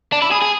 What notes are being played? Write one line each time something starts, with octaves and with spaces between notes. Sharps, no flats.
D4
E4
G#4
G#4